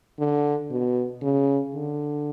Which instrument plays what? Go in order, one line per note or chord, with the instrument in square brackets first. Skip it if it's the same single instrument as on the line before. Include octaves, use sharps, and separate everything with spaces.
[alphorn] D3
B2
C#3
D3